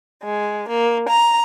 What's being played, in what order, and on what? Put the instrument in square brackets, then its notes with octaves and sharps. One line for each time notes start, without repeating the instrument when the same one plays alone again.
[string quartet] G#3
A#3
A#5